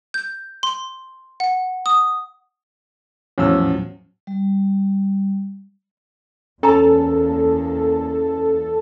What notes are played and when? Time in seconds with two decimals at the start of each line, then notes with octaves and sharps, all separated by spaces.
0.14 G6
0.63 C6
1.40 F#5
1.86 D#6
3.38 E2 A2 F3 F#3 C#4 E6
4.27 G3
6.63 E2 A#3 C#4 A4 G#5 A#5 B5